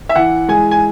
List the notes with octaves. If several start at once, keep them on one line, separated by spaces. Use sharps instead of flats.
E5
E3 F#5
G#3 G#5
G#5